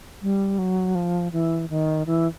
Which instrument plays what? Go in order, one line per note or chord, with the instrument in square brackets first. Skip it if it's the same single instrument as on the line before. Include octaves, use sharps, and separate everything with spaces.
[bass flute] G3
F#3
F3
E3
D#3
E3